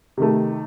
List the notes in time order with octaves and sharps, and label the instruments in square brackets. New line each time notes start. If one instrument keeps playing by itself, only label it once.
[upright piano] C3 D#3 A3